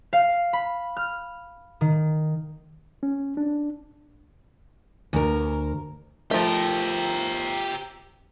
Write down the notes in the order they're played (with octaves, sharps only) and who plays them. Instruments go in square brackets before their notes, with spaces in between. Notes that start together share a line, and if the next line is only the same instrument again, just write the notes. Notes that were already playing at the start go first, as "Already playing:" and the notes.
[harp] F5
B5
F6
D#3
[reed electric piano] C#4
D4
[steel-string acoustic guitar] D2 A#4
[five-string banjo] F3 A3 [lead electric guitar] G4 A#4